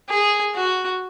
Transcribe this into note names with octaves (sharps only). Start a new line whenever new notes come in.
G#4
F#4